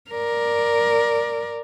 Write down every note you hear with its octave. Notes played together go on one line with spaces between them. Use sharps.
A#4 D5